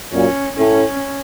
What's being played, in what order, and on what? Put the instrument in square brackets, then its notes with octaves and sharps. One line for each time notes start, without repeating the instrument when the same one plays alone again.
[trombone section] F#2 A#2 [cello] C#4
[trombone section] A2 [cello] C#4